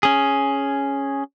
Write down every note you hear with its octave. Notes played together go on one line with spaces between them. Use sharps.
C#4 G#4